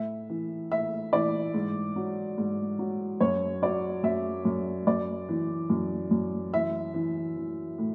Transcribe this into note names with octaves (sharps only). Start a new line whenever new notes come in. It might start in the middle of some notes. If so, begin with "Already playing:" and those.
Already playing: A2 E5
E3
A2 E5
E3 D5
G#2
F#3
G#2
F#3
F#2 C#5
F#3 D5
F#2 E5
F#2
F#2 D5
E3
F#2
F#2
E3 E5
E3
E3
A2